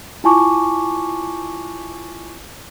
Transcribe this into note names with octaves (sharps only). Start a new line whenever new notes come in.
E4 F4 G#5 A5 C#6 D6